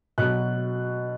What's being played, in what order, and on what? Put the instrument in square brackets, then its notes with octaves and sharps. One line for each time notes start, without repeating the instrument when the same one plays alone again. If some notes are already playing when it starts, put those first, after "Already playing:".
[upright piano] B2 F#3 F#6